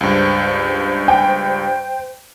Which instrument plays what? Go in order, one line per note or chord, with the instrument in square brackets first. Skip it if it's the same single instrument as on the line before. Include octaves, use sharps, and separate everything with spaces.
[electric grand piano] C#2 G2 [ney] C5
[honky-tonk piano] G5